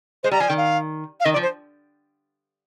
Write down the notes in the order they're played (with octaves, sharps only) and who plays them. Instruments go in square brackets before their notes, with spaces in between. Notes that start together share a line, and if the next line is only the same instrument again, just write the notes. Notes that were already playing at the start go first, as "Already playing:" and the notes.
[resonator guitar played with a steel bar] G#3 [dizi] C5
[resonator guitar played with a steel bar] G3 [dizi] A#5
[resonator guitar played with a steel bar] F3 [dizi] G#5
[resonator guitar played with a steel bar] D#3 [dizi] G5
[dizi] F5
F5
[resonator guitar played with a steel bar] D#3 [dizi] D#5
[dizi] D5
[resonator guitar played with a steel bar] F3
[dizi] C5